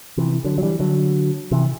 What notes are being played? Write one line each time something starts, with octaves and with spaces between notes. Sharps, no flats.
C3 E3
D3 F#3
F#3
E3 G3
D3 F#3
C3 E3